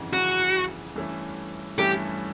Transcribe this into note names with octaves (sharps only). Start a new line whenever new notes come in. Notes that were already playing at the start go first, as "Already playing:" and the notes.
Already playing: G1 F2 C#3 E3
G1 F2 C#3 E3 F#4
G2 E3 A3 C#4
G2 E3 A3 C#4 G4